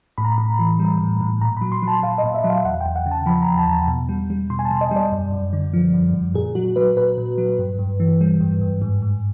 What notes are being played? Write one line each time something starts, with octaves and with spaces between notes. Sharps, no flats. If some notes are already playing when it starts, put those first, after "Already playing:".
A2 B5
A#5
B5
A2
E3
G3
A2
A2
A#2 A#5
B5
F#3
C6
F#3 A5
A#2 F5
D#5
A#2
E5
F#3
F5
E2 F#5
G5
E2
F#5
C#3
A5
F3 B5
A#5
E2
A5
E2 A5
B2
G3
G3
B2 C6
G#5
A5
B2
D#5
G3 D5
F#2
F#2
D3
F3
F#2
F#2
A#2 G#4
F#3 F#4
F#3 B4
A#2 B4
A#2
F#3
G2
G2
E3
G3
G2
G2
G#2
G#2